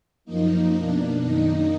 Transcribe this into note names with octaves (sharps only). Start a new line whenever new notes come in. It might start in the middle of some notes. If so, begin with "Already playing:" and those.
F#2 F3 A#3 D#4
B2 A#3 D4
F#2 D#3 A#3 D#4